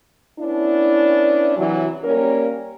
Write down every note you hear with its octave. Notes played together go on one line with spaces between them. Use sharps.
B3 C#4 D4 E4
C3 E3 F#3
G3 A#3 C#4 A#4